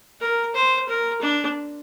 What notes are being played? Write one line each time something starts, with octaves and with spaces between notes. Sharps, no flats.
A#4
C5
A#4
D4